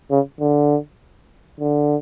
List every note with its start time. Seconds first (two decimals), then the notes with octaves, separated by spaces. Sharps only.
0.11 C#3
0.41 D3
1.60 D3